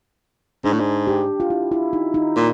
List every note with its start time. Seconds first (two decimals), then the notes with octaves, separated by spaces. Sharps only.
0.64 G#2 D4
0.73 A2
0.80 G#2
1.07 G4
1.40 F4
1.50 E4
1.72 E4
1.93 D#4
2.14 D#4
2.36 A#2